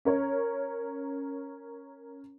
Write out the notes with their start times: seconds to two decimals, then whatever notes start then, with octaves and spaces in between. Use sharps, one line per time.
0.05 C#4 A#4 C#5